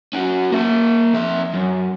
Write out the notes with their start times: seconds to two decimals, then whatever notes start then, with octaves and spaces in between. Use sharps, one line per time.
0.13 C#4 F#4
0.52 A#3 E5
1.14 F2 E5
1.54 F#2